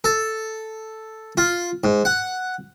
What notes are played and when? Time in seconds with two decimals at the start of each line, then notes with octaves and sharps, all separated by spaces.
0.04 A4
1.37 F4
1.84 G#2
2.05 F#5